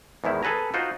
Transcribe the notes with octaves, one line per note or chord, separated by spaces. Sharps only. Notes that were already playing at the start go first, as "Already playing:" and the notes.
E2 G#2 D#3 E4
G#4 A4 B4 G#5 A#5
D#4 F4 F#4 C5